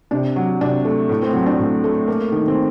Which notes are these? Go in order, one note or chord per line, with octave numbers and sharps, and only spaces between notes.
C3 D4
F#3
C3 D4
A3
A2
C4
F#3 C4
D4
A2
A3
A#3
D#3
C4